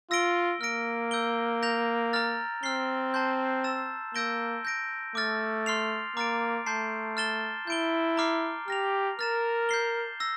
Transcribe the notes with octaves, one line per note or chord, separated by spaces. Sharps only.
F4 E6 A#6 D7 G7
A#3 F6 A#6 D7
E6 G6 D7 G7
G6 A#6 F7
A#5 F6 A6
C4 F6 C7 G7
A5 C6 G6
E6 A6 E7
A#3 E6 G6 A#6 D7 G7
G6 A#6 D7
A3 D6 F6 A6
C6 F6 C7 F7
A#3 A#5 D6 F6 A6 D7
A3 A5 C6 G6 C7
F6 A6 E7 G7
E4 G6 D7 G7
A#5 D6 F6 C7
G4 F6 A#6 F7
A#4 F6 A6 E7
G6 C7 G7
E6 A#6